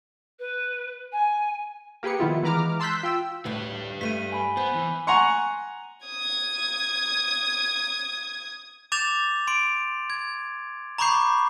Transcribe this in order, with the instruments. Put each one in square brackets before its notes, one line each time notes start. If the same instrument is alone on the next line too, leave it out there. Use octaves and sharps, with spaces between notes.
[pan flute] B4
G#5
[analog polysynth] A#3 G4 G#4 B4 C#7
D#3 F3 B3 E4 F4
E3 G#3 B4 A#5 D6 F6
A5 C6 E6 F#6 G6 B6
F4 G5 E6
[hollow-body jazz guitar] D2 A2 [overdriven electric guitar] G3 B4
[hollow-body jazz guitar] G2 A3 [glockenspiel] B6 D#7
[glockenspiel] G#5 B5
[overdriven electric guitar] B3 [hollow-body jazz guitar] C5
[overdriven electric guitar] E3
[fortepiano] F#5 G#5 A#5 C6 C#6
[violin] D#6 G#6
[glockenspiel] D6 G6 A6 E7 F7
C6 D7
G#6
A#5 B5 C#6 D6 G6 C7